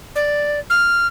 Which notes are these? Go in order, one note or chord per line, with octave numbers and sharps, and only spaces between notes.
D5
F6